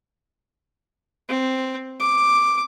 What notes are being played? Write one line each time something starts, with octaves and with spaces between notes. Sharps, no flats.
C4
D6